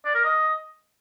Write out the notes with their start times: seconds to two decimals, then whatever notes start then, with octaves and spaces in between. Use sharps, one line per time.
0.05 D5
0.15 A#4
0.24 D#5